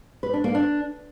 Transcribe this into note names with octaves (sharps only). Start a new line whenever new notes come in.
B4
D4
A#3
D4